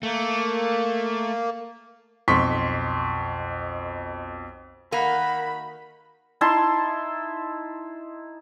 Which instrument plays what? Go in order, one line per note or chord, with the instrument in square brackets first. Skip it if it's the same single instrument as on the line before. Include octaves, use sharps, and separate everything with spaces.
[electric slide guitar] A3 [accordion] A#3
[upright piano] B1 F2 C6 C#6 B6
[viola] D#3 B5 [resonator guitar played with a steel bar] A#3 [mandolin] F#4 D#5 F#5
[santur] D#4 E4 A5 C6